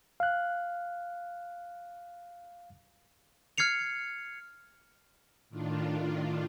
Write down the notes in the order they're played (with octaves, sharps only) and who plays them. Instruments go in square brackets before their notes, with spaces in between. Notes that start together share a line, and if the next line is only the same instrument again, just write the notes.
[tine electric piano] F5 F#6
[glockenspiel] F6 G#6 C7 C#7 F7
[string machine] A2 D#3 D4 F4